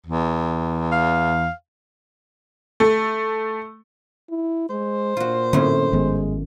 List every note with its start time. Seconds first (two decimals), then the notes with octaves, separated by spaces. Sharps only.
0.06 E2
0.92 F5
2.80 A3
4.30 E4
4.70 G#3 C5
5.17 A#2 F4 F#4
5.53 F#2 A2 D3 A#3 C4 C#4
5.92 G#1 D#3 G#3 B3